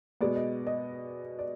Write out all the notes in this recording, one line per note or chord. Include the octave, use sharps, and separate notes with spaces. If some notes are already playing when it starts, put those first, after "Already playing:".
B2 G#3 B3 D5
D#5
D#5
D5